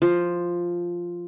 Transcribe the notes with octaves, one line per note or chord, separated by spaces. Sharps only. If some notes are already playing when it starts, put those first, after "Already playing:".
F3